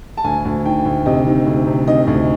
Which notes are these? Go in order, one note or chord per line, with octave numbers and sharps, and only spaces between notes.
A5
D2 G#5
D2
D#3 G5
D2
C3 D#5
D#3
D2
C3
D#3 D#5
D2